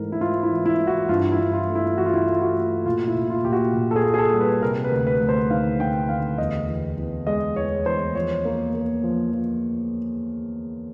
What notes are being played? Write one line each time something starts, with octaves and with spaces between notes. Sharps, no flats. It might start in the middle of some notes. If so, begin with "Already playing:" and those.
Already playing: G#2 E3 A3 A#4
E4
G#2 F4
E4
E3
E4
E3
F#4
G2 F4
E4
G2
F4
A3
E4
E3 F#4
F4
E4
F4
A3
F#4
A3
A#2 F4
E4
A#2
F4
A#2 G4
F#4
A#2
A4
G#4
A#3
G#4
A4
G3
B4
C3 A#4
B4
D2
B4
D2
C5
D#3 F5
D#3 G5
D2 F5
E2 D#5
E2
E2
G#3 D#5
E2 C#5
E2 C5
F3 C#5
A#3
A#3
F3
F3